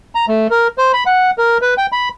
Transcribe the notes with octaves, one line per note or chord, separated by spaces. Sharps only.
A#5
A3
A#4
C5
B5
F#5
A#4
B4
G5
B5